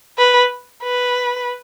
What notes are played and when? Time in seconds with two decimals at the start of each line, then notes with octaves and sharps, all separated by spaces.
0.18 B4
0.84 B4